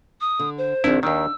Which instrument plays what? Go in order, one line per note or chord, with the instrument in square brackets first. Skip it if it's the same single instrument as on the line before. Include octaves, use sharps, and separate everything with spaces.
[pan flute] D#6
[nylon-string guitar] D3
[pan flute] C5
[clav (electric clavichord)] A#1 E4 [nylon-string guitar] D#3 C4 D4
[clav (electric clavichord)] D#2 D#3 [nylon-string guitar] D4 [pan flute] E6